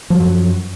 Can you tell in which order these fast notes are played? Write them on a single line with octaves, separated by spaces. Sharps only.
F3 F#3 F#2